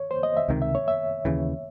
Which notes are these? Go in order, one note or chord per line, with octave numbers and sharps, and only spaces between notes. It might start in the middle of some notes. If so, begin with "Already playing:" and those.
Already playing: C#5
C5
D#5
E5
C#2 C3 D#3
E5
C#5
E5
D#2 C#3 E3